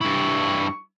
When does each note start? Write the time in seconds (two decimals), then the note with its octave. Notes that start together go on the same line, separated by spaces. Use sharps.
0.01 G2 E4 C#6